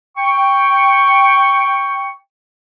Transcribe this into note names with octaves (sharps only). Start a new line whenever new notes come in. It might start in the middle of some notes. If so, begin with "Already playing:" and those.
G5 C#6